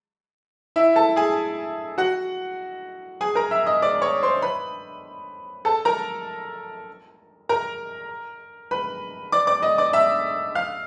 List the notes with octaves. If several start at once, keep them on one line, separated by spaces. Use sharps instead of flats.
E4 E5
A4 A5
G#4 G#5
F#4 F#5
G#4 G#5
A#4 A#5
E5 E6
D#5 D#6
D5 D6
C#5 C#6
C5 C6
B4 B5
A4 A5
A#4 A#5
A#4 A#5
B4 B5
D5 D6
D5 D6
D#5 D#6
D5 D6
E5 E6
F5 F6